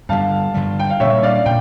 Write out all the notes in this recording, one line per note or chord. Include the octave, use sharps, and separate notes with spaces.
G2 D3 G3 F5 A5
G2 D3 G3
G5
F5
A#2 G3 A#3 C#4 C#5 E5
D5 F5
F5
A#2 G5